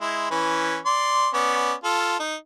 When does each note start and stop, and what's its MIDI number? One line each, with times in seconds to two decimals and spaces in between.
0.01 0.27 56
0.01 0.27 64
0.31 0.78 52
0.31 0.78 61
0.31 0.78 71
0.86 1.29 74
0.86 1.29 84
1.34 1.73 59
1.34 1.73 61
1.34 1.73 74
1.84 2.16 65
1.84 2.16 69
2.20 2.35 63